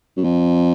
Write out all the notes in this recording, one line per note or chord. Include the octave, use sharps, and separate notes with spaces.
F#2
F2